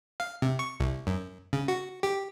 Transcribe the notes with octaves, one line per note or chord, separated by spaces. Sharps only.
F5
C3
C#6
C2
F#2
C#3
F#4
G4